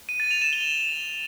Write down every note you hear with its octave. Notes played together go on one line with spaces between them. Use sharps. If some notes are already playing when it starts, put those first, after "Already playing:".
D#7
A6
F7
E7
G7